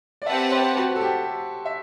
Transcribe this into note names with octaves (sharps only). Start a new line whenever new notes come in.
D5
C4 G4 B4 E5 F#5 A5
C5
F#4
A4
G4
E5